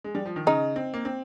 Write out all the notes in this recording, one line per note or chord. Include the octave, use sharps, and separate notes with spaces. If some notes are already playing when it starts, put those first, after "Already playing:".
G#3
G3
F3
D#3
C#3 D#4
C4
A#3
C4